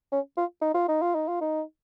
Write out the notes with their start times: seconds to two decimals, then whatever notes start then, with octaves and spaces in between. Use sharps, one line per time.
0.12 C#4
0.37 F4
0.62 D#4
0.75 F4
0.89 D#4
1.02 F4
1.15 D#4
1.28 F4
1.41 D#4